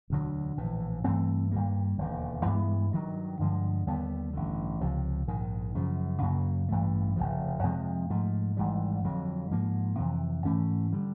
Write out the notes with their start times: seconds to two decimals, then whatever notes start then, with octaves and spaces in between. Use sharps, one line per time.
0.10 E1 D2 D3 F#3
0.57 A#1 A2 E3
1.04 G2 E3 A3 C4
1.51 G2 D#3 G3 A#3
1.98 E1 D#2 D3
2.46 G2 E3 G#3 B3
2.92 G2 D#3 F#3
3.39 G2 D3 F3 G#3
3.87 D#2 D3 G3 B3
4.33 A1 G2 D3
4.81 C#2 C3 F3
5.28 A#1 G#2 D#3
5.75 F#2 C#3 F3
6.22 F#2 C#3 F#3 A#3
6.68 A1 G2 E3 A3
7.16 F1 E2 C#3 F3
7.63 F2 C3 F3 G#3
8.10 G#2 F3 A3
8.57 G#1 G#2 E3 G3
9.04 F2 D3 F#3
9.51 G#2 F3 A#3
9.98 F2 C3 E3
10.45 G#2 E3 A3 C#4
10.93 D3 G3